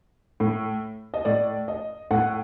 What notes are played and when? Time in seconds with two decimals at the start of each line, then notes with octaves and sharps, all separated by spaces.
0.40 A2
1.14 D#5
1.25 A2 D5
1.68 D#5
2.11 A2 F#5